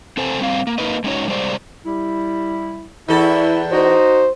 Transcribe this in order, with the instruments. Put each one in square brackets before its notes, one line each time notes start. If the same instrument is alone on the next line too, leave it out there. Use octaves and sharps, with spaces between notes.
[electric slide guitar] C4 A4 C5 G#5
G3 C4 F5
A#3
A#3 D#4 A#4 B4 D#5
G#3 A3 C#4 D#4 F#4 C#5
G3 G#3 C5 D5
[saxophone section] G3 E4
[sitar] E2 A4 [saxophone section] E4
[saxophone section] D#4 F#4 [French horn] C5